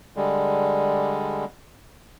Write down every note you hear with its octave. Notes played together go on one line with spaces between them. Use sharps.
D3 G3 G#3